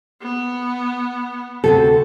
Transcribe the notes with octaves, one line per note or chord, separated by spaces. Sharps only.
B3
D2 C3 F#4 A4